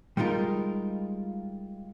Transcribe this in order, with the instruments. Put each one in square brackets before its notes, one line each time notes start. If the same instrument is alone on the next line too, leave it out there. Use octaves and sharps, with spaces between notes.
[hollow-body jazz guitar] G3 G#3 D#4 F4 A#4